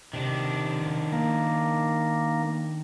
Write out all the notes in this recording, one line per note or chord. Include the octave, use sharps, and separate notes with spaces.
C3 D#3 D4
A#3